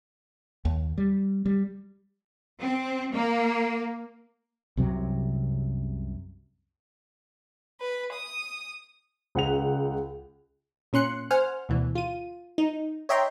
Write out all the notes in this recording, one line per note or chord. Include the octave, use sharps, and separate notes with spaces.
D#2
G3
G3
C4
A#3
C2 F#2 C3 F#3
B4
D#6
C#2 F#5 F7
A#2 C#4 C6 F#6 C#7
C5 F#5 G#5 F6
D2 B2 E3
F4 D#7
D#4
C#5 D#5 E5 G5 A#5 C6